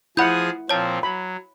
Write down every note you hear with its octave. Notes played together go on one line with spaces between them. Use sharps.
F3 E4 G#4 F#5 B5 D#6 G6
A#2 F3 C4 C#5 A5
F#3 B5